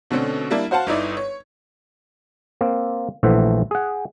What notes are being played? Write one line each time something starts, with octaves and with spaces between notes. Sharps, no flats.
B2 D3 A3 C4 C#4
G3 A#3 D4 E4
F#4 C5 F5 F#5 A5
G1 D#4 E4 D5
C#5
A#3 C4
A#1 E3 A3 C5 E5 F#5
G#4 F#5